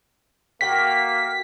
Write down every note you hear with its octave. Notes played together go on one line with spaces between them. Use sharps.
A3 A#3 F#4 G5 B6